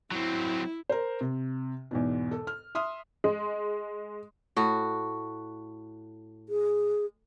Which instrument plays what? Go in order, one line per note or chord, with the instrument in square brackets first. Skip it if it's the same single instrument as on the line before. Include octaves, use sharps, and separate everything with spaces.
[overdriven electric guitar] F#3 C4 [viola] E4
[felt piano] A#4 C5
C3
E2 G#2 B2
A4
F6
E5 C6 D#6 F6
[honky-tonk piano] G#3
[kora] A2 F#4
[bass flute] G#4